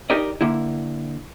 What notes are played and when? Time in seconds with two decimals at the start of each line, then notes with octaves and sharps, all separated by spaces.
0.10 D#4 G4 A#4 D5 D#5
0.41 D3 A#3 E4